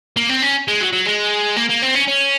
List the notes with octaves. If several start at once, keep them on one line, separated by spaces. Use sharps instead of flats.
A#3
C4
C#4
G#3
F#3
F#3
G#3
A#3
A#3
C4
C#4
C#4